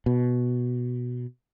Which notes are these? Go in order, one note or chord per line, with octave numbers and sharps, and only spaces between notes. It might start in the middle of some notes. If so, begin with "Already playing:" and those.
B2